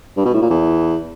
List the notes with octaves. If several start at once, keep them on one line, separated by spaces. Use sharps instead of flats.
G2
B2
A2
A#2
E2